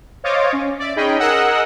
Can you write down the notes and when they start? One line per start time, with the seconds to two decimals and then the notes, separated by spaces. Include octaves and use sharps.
0.24 C5 C#5 D#5 F5 D6 A6
0.53 C#4
0.79 D5 E5
0.96 C#4 D#4 G#4 D#5 G5 B5
1.19 G#4 A#4 D#5 F#5 E6